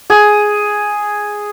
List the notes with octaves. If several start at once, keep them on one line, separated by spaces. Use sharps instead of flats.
G#4